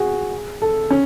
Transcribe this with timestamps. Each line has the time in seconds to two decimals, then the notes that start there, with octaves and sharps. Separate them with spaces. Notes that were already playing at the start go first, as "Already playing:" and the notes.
Already playing: F#4 G#4
0.62 A4
0.91 C#4